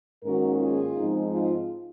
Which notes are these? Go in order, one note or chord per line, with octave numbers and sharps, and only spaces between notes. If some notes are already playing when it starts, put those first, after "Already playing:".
G#2 D#3 A#3 C#4 F#4 A#4
F4 G#4
G#2 F3 C4 D#4
F4 G#4